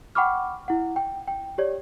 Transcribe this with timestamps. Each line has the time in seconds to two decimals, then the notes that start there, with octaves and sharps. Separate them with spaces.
0.15 F#5 G5 B5 C#6 D6 F6
0.68 E4 F#5
0.96 G5
1.28 G5
1.58 G4 C#5 D5